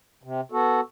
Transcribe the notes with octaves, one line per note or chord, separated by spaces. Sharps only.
C3
B3 F#4 A4